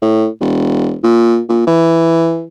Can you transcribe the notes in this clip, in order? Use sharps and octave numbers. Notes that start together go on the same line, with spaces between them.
A2
E1
A#2
A#2
E3